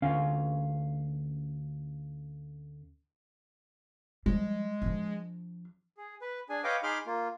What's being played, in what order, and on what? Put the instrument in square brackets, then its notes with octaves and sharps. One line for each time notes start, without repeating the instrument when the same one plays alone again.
[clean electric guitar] D2 C#4 F5
[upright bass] F3 G3 [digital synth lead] G#3
[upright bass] F3 D4
[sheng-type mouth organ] G#4
B4
D4 G#4 G#5
B4 C#5 D#5 F5 G5 D6
D#4 G#4 B5 C6 D6 F6
A#3 F4